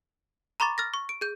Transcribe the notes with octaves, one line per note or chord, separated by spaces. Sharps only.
A#5 B5 C#6 D6 A6
F6 A6 A#6
C#6
D7
G#4 G6